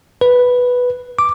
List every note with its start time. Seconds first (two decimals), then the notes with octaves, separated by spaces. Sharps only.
0.21 B4
1.19 D6